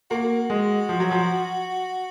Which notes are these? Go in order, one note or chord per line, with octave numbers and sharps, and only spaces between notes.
A#3 F#4
G#3
F3
F#3
F3